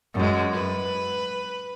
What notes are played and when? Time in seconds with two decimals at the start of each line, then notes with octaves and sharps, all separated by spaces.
0.15 F#2 G#3
0.53 B4